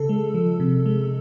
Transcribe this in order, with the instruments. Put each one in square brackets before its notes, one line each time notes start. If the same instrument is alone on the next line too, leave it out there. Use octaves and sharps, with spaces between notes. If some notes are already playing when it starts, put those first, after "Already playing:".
Already playing: [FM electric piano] C#3 A4
G#3
F3
C3
G#3